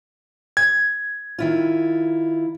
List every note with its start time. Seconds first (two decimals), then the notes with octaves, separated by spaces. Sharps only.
0.57 G#6
1.39 D#3 E4 F4